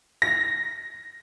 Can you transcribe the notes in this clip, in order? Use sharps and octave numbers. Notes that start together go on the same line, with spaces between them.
A#6